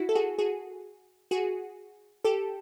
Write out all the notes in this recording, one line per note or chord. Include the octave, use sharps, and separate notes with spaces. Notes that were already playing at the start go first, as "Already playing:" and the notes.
Already playing: E4 F#4
A4
F#4 G#4
F#4 G#4
F#4 G#4
G4 A4